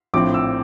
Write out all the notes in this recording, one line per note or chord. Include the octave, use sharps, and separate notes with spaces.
A#1 A2 F3 C4 D6
E6